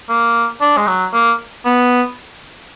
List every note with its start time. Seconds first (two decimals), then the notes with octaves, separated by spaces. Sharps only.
0.09 A#3
0.61 D4
0.77 G#3
0.87 F#3
1.13 A#3
1.65 B3